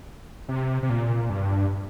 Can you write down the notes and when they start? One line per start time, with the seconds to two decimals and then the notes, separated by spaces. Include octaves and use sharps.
0.49 C3
0.83 C3
0.89 A#2
1.30 G2